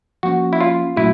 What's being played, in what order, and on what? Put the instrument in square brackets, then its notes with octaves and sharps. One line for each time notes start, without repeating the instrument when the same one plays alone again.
[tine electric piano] F3 A#3 C#4 [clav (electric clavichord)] F#4
[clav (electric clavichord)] E4
F4
[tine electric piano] A#2 F#3 A3 C#4 F#4 [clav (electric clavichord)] E4